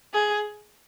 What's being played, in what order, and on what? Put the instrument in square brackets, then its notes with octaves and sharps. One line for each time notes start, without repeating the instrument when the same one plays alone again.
[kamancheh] G#4